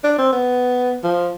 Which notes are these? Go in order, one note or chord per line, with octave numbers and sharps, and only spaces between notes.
D4
C4
B3
F3